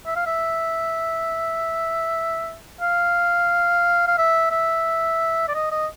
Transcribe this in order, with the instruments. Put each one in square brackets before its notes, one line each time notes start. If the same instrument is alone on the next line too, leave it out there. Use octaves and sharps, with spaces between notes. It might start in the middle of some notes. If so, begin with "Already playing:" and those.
[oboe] E5
F5
E5
F5
F5
E5
E5
D5
D#5
D#5